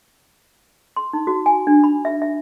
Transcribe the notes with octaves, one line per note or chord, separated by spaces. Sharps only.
C6
D#4
F#4
G#5
D4
B5
E5
E5